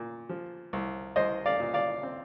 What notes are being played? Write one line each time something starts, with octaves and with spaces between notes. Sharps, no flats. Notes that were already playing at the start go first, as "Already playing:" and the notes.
Already playing: A#2
F3
C2
C2 C5 D#5
D5 F5
A#2
D5 F5
C4